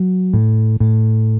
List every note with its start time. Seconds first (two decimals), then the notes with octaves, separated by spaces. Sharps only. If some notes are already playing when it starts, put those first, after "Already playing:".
Already playing: F#3
0.34 A2
0.80 A2